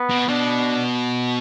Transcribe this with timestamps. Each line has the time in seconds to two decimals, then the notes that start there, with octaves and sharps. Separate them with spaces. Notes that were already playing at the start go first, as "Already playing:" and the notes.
Already playing: B3
0.10 B2
0.28 B2 D4